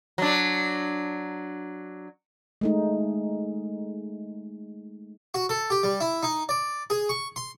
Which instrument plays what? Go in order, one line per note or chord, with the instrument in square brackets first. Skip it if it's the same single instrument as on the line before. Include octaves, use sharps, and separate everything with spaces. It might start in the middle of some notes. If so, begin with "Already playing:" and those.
[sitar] F#3 D4
[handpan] G#3 A3 D#4
[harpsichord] F#4
A4
G4
G3
E4
D#4
D5
G#4
C#6
C6